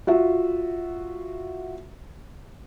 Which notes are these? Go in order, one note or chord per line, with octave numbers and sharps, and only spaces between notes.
F4 F#4 E5